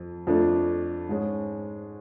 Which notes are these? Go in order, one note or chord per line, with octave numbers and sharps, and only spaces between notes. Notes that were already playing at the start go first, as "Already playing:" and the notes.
Already playing: F2
F2 F3 A3 D4
G#2 G#3 C#4